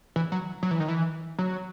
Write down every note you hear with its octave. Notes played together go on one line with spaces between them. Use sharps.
E3
F#3
F#3
E3
D#3
E3
F#3